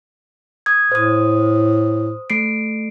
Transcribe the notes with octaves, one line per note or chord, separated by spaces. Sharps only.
D#6 G#6
A2 C5 D#6
A3 C7 D7